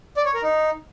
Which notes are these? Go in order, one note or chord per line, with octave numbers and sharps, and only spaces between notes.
D5
C#5
A#4
D#4